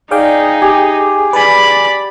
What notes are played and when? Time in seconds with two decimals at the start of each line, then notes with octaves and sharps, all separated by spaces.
0.11 D#4 G#4 D5 F5 G5
0.62 G4 G#5
1.33 B4 D5 G#5 B5